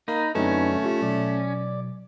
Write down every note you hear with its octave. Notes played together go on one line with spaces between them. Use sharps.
A#3 D#4 A#5 B5
F#2 D3 F#3 A3 C4 C#4 D#4 B4
F4 G4 E5
B2 F#3 D5